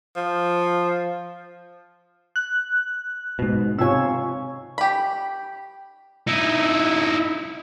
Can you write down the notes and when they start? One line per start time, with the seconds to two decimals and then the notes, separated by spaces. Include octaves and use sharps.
0.16 F3
2.36 F#6
3.39 G#2 B2
3.79 C3 D#4 F4 C#5 G#5 E6
4.78 G4 B5
6.27 D#4 E4